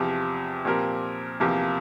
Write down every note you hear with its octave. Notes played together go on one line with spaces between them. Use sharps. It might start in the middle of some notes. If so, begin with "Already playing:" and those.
Already playing: E2 C3 F3
A#2 F3 C4 G4 A#4
E2 C3 F3 A#3